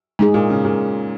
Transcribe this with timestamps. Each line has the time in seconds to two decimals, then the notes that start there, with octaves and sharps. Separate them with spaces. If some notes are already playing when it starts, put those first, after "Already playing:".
0.19 G#2 G#3 D#4 G#4
0.34 A#2
0.50 C#3
0.65 A#2